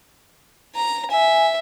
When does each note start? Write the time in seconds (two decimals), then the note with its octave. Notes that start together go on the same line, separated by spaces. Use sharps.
0.75 A#5
1.11 E5 G#5